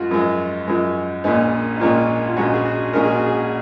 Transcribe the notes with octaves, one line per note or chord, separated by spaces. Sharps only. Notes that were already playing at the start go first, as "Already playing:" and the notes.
Already playing: F#2 F3 G#3 F4 F#4
F#2 F3 G#3
F#2 F3 G#3
A#1 A#2 G#3 C#4 D#4
D#4
A#1 A#2 G#3 C#4 F4
F4
A#1 A#2 G#3 C#4 F#4
G#4
F#4
A#1 A#2 G#3 C#4 A#4
G#4
F#4
G#4